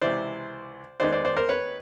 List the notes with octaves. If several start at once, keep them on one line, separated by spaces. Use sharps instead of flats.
C#2 C3 E3 C5 D5
D#2 D#3 G#3 B3 D#4 C5 D5
C5 D5
C5 D5
A#4 C5
B4 C#5